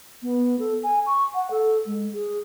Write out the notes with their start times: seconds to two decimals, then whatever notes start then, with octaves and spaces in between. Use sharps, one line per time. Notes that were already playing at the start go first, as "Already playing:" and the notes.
0.23 B3
0.59 A4
0.83 G#5
1.06 C#6
1.35 F#5
1.51 A4
1.86 G#3
2.13 G#4